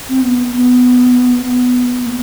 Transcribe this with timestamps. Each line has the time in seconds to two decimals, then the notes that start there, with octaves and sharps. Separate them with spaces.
0.09 C4
0.23 B3
0.54 B3
1.45 B3
2.06 A#3